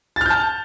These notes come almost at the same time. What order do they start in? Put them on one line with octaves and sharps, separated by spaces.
A6 F6 G6 A5